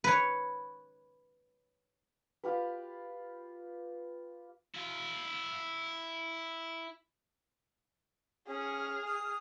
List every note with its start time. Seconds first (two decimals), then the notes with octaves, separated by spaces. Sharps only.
0.04 B4 C#5
2.44 F4 G4 B4
4.74 E4 F5
8.48 C#4 G#4 F6
9.06 D#6